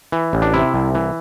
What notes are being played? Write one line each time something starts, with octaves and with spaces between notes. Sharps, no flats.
E3
A1
D4
C3 E4
C2
E3